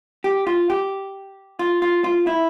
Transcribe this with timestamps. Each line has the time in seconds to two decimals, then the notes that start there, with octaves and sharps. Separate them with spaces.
0.24 G4
0.47 F4
0.70 G4
1.59 F4
1.82 F4
2.04 F4
2.27 E4